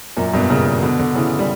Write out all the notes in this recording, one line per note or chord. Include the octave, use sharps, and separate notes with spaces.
F#2 A#2
G2 B2
A#2 C#3
B2 D3
B2 D3
C#3 E3
G3